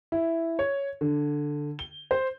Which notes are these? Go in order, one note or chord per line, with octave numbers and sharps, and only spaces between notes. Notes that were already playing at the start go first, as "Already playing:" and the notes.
E4
C#5
D3
G7
C5